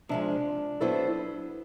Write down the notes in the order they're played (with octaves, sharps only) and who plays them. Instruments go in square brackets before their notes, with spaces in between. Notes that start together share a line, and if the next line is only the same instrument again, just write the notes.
[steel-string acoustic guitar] C3 F3 G#3 [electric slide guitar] D4
[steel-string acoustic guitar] F#3 B3 E4 A4 C5